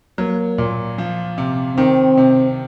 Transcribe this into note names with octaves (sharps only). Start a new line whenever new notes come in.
F#3 A#3
A#2
F3
C3
D#3 C4
C3